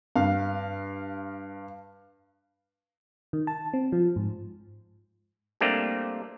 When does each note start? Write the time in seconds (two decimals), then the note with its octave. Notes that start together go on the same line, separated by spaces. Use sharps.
0.16 G2 F5
3.33 D#3
3.47 A5
3.73 C4
3.92 F3
4.16 G#2
5.61 G3 A3 A#3 C4 D4 G4